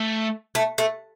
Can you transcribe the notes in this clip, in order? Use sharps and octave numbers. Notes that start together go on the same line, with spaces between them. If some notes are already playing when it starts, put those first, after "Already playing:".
Already playing: A3
A3
A3